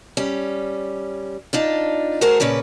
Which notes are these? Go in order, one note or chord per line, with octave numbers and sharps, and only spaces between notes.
G3 C#4
D4 D#4 F4
A3 F#4 G#4 A#4 C5
A#2 C#3 C#4 B4 D5